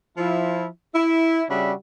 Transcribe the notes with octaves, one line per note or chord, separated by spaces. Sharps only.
F3 E4
E4
C#3 G3 D4 F#4 E5 B5